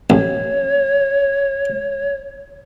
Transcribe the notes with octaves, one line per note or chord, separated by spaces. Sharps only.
A1 C#5